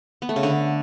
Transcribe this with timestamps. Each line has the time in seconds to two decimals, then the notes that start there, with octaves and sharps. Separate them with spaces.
0.22 B3
0.29 A3
0.36 C#3
0.43 D3